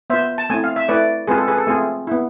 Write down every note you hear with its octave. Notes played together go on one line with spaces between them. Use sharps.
B3 F4 C5 E5
A5
A3 C4 E4 G#5
F5
E5
A3 E4 B4 D5
G#3 C4 F4 G#4 B4
A4
G#4 B4
A4
A3 C4 F4 G#4
B3 E4